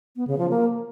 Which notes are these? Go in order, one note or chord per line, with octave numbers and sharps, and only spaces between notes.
B3
C#3
F3
A#3